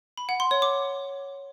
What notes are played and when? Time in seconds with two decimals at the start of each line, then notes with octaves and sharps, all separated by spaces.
0.18 B5
0.29 F#5
0.40 C6
0.51 C#5
0.62 D6